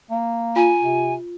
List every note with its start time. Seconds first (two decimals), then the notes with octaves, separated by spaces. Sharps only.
0.10 A#3
0.56 F4 G#5
0.81 C3